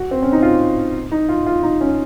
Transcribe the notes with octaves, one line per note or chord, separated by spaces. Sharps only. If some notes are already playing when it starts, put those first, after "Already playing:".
Already playing: F#4
C4
C#4
D#4
F4
D#4
F4
F4
D#4
C#4